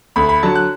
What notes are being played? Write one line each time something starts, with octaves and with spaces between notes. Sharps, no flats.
D2 B5
B5
D3 F#3 A5
F#6